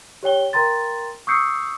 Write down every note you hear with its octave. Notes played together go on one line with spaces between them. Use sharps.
G4 C#5 G5 G7
A#4 G5 A#5 C6 A6
C#6 D#6 E6 G6 C7 C#7